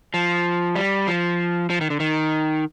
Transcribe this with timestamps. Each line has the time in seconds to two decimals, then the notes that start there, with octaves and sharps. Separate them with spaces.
0.14 F3
0.75 G3
1.07 F3
1.70 F3
1.81 D#3
1.90 D3
2.00 D#3